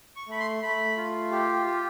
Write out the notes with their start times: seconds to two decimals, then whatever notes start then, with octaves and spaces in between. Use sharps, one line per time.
0.16 C#6
0.28 A3 B5
0.39 C6
0.63 A3 B5
0.97 F4
1.31 G4
1.66 G4